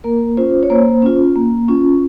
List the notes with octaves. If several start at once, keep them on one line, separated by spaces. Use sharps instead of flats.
A#3 A#4
C#4 F4 C5
C#5
A#3 C5
C#4 F4
A#3
C#4 F4